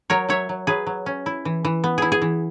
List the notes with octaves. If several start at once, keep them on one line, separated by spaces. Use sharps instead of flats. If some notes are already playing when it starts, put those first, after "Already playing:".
F#3 A#4 C#5
F#3 C#5 E5
F#3
F#3 G#4 B4
F#3
C#4
E4
E3
E3
B3
E4 G#4
G#4
E3